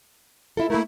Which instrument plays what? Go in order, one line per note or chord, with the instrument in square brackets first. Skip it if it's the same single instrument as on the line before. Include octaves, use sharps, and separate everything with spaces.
[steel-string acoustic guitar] E4 F4 A4
[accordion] A3 E4 [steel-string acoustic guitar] A#3 A#4